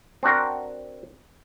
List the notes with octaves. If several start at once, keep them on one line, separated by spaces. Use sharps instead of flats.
C4 D4 F#4 A#4